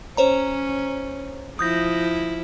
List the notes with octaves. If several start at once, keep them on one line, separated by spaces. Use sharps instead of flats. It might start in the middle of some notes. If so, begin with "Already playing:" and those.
C#4 C5 C#5 A#5
F3 E4 D#6 G6 A#6